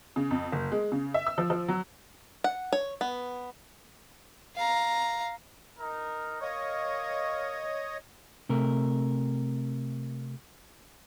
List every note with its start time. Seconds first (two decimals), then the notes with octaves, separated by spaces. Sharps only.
0.16 C#3
0.31 F2
0.52 F#1
0.72 G#3
0.92 C#3
1.14 E5
1.27 E6
1.38 F3
1.50 F3
1.68 F#3
2.44 F#5
2.73 C#5
3.01 B3
4.56 F5 A#5
5.78 D#4 A#4
6.41 A#4 C#5 D#5 F5 C#6
8.49 C3 A3 A#4